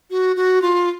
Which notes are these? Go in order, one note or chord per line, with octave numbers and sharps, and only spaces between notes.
F#4
F#4
F4